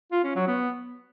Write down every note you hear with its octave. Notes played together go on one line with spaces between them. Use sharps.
F4
C#4
F#3
B3